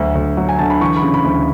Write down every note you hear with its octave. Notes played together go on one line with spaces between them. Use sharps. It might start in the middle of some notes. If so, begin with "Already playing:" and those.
Already playing: D2 D3 F#3
D2
F#3
G#5
D3 A5
B5
E3 C#6
B5
C#3
B5
D2